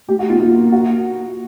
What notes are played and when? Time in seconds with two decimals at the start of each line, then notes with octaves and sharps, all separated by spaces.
0.08 A3 G4
0.19 F#4
0.30 B3 F4
0.40 A#3 F4
0.72 F#4